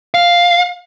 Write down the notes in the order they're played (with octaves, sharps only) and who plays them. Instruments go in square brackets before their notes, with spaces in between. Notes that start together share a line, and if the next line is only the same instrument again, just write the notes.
[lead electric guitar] F5